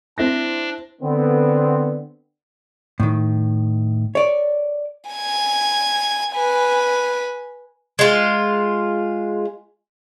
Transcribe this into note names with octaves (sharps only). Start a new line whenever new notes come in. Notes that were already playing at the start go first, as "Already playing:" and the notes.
C4 D4 E4 A#6
D3 B3 C4
A2 D#3
C#5 D5
G#5 G#6
B4 G#5
G#3 F4